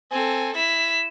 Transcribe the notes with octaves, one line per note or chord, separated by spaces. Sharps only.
C4 A4 G#5
E4 B6 E7